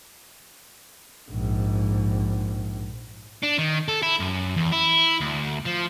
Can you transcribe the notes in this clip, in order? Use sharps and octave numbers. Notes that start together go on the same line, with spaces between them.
A#1 G#2
D4
D#3
A4
E4
F#2
E2
E4
D2
F3